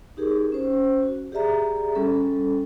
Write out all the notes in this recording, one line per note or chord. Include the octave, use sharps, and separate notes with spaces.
D#4 G4 G#4 A#4
C#4 C5
F#4
G4 G#4 D5 E5 A#5
G3 C#4 A4